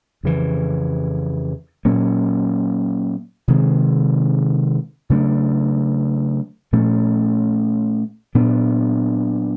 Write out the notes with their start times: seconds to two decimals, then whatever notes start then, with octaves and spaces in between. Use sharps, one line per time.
0.23 F2 C#3 E3
1.85 A#2 F#3 A#3 C#4
3.48 C3 D#3 G#3 C4
5.10 C#3 F#3 A3 D4
6.73 A#2 F3 A3 C#4
8.35 A#2 F#3 B3 D4